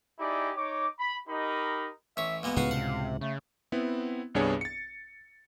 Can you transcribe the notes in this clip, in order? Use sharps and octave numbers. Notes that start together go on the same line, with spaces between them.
D#4 E4 G4 G#4 D5
D#4 C#5 D6
B5
D#4 G4 A#4 D#5 B5
A1 C#5 E5
B1 G#3 A#3 B3
C#2 A2 C#3 B3 F#4 B4 F5
C3 F#5
C#3 A3
B3 C4 E4
C2 G2 B3 D4 G#4 C#5
A6 C#7